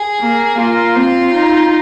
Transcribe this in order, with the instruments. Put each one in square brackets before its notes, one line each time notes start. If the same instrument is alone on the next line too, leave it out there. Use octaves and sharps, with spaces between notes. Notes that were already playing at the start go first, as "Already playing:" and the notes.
Already playing: [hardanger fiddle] G#4
[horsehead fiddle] A#3
[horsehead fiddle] A#3 [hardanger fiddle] F4
[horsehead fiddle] C4
D#4